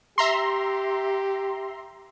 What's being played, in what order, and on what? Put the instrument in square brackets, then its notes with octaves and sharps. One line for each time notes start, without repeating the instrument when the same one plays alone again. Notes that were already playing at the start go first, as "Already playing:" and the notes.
[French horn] G4 [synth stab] E5 A#5 C6